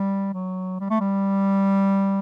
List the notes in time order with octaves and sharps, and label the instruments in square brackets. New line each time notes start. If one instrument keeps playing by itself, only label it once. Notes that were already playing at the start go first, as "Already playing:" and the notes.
Already playing: [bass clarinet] G3
F#3
G3
A3
G3